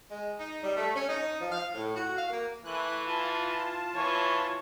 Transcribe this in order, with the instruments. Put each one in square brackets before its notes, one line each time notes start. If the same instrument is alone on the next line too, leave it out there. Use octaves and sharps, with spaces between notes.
[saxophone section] G#3
D#4
G3
A3
C#4
D#4
F3
F5
A2
F#4
F5
A#3
[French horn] E3 [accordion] A3 F#6
[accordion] F4 A5
[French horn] E3 [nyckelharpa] C#5